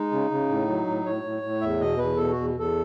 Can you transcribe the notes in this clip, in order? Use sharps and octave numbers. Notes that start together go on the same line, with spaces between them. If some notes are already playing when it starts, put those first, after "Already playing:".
Already playing: G#3 D#4
C#3
C#3
A2
F#3
A2
A2 C#5
A2
A2
E2 E5
B2 D#5
E2 B4
B2 A4
E2 F#4
E2 A4